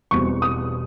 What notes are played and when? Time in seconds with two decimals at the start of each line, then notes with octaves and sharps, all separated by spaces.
0.11 E1 E2 B2 G3 C4 C#6
0.42 D#6